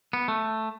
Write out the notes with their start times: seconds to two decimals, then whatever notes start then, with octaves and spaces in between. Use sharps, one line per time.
0.13 B3
0.28 A3